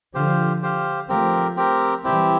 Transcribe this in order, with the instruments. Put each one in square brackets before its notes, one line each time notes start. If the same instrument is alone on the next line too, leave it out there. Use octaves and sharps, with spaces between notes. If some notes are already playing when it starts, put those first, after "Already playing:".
[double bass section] D3 F3 [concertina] G4 C5 F5
[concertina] G4 C5 F5
[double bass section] F3 A3 [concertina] C4 G4 A#4
[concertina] C4 G4 A#4
[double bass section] E3 G3 [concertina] C4 E4 G4